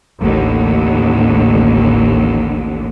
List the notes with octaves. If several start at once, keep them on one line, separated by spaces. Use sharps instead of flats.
A1 D#2 D3